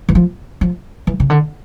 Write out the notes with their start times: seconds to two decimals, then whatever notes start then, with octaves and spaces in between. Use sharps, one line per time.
0.09 E3
0.15 F3
0.61 F3
1.07 E3
1.20 C#3
1.30 D3